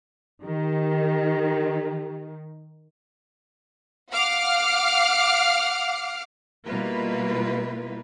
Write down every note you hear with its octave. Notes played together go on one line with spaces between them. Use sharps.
D#3 G4
F5 F#5 D6 F6 C7
B2 G3 A#3 E4 F4 B4